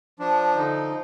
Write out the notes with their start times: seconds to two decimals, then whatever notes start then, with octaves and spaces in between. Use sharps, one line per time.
0.19 F3 D4
0.56 D3 D#4